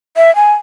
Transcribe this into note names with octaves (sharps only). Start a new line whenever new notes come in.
E5
G#5